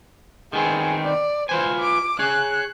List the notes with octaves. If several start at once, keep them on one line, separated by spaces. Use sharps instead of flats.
D#3 B3 C4 G#4
D5
F4 B4 C5 G#5
D6
G#4 C#5 F#6